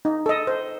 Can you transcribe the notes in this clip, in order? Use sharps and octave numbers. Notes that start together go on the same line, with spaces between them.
D#4
A4 D#5
C5